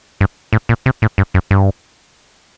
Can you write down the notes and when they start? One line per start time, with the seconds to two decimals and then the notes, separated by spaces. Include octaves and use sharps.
0.21 G2
0.53 A2
0.69 A#2
0.86 C3
1.02 A2
1.18 G2
1.34 F#2
1.51 G2